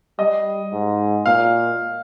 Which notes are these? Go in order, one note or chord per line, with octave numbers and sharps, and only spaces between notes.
G3 D#5
G#2
A#2 F5